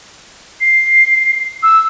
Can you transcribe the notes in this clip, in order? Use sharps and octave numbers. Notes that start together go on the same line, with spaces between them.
C7
E6